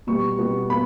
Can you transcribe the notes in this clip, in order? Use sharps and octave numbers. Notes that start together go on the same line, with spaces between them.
B2 G3 B3 C#6
B2 G3 B3
B3 B5